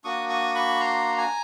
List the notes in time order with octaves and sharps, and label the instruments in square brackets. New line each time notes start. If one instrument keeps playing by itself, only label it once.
[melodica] A#3 D4 F#4 C#6 D#6
C#6 D#6
B5 C#6
A#5 C6
G#5 A#5